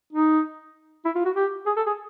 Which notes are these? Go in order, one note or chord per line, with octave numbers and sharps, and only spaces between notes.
D#4
E4
F4
F#4
G4
G#4
A4
G#4